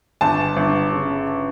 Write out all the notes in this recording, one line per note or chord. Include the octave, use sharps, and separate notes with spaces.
G1 A5
G1
C#3